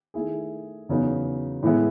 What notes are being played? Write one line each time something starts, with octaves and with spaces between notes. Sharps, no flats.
D#3 A3 E4 G#4
E2 C#3 F#3 B3 D#4
A2 E3 G#3 B3 E4